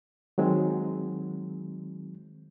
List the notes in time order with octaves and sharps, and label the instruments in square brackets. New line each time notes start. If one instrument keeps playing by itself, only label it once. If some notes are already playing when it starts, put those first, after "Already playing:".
[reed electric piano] D#3 F#3 G#3 C4